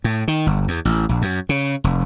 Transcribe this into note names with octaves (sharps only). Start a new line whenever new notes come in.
A2
D#3
G1
E2
A1
A#1
F#2
C#3
F1